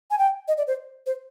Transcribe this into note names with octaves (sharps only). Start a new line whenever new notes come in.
G#5
G5
D#5
D5
C5
C5